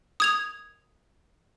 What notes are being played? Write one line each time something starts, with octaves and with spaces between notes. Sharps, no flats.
D#6 G#6 F7